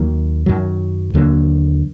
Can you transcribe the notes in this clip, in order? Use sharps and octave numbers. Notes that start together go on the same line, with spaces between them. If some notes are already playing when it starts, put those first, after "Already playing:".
Already playing: D#2 D#3 F#3 A#3
F#2 D#3 F#3
D#2 D3 F#3 A#3